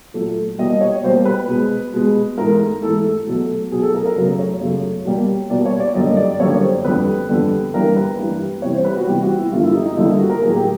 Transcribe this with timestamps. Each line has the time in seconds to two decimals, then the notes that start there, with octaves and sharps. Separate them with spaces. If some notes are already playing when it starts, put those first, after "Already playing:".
0.14 A#2 F#3 A3
0.59 B2 G3 A#3 D#5
0.81 C#5
1.03 B2 G3 A#3 C5
1.25 B4
1.48 B2 G#3
1.93 B2 G#3
2.38 G#2 E3 A3 A#4
2.83 G#2 E3 A3 A4
3.04 A4
3.27 B2 F#3 A3
3.72 B2 F#3 A3 G#4
3.82 A4
3.95 A#4
4.06 A#4
4.16 F#2 C#3 F#3 A3
4.39 C#5
4.61 F#2 C#3 F#3 A3
5.05 B2 G3 A#3
5.50 B2 G3 A#3 D5
5.66 C#5
5.80 D5
5.94 F#2 D3 G3 A#3 D#5
6.17 D5
6.39 F#2 D3 G3 A#3 C#5
6.62 C5
6.85 F2 D3 G3 B4
7.29 F2 D3 G3
7.74 G2 E3 G3 A#3 A#4
7.96 B4
8.19 G2 E3 G3 A#3
8.62 C3 E3 G3 C#5
8.74 C5
8.84 B4
8.97 F#4
9.07 C3 E3 G3 G4
9.23 F#4
9.37 E4
9.52 G2 D3 G3 A#3 F4
9.63 E4
9.75 D#4
9.86 D#4
9.97 G2 D3 G3 A#3 E4
10.19 F#4
10.30 A#4
10.42 A2 F#3 A#3 G#4
10.56 G4